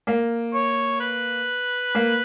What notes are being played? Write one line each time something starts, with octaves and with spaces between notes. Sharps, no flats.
A#3
C#5
B4
A#3